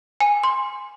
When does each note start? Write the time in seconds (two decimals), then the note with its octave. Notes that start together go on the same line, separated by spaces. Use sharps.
0.21 G#5
0.44 C6